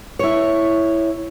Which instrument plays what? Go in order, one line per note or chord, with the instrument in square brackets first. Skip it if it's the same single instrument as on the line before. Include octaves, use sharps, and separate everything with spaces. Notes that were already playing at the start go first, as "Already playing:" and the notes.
[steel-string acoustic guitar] E4 C#5